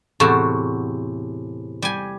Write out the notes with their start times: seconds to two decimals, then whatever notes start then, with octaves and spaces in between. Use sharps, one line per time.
0.20 E2 A2 C3 F#4 A5
1.82 G3 G#5